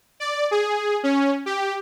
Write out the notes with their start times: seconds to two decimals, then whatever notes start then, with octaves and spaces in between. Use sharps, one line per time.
0.20 D5
0.51 G#4
1.03 C#4
1.46 G4